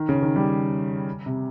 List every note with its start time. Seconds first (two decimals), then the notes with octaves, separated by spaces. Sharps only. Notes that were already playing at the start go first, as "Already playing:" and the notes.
Already playing: D#3
0.09 C#3
0.22 D#3
0.36 G3
1.26 C3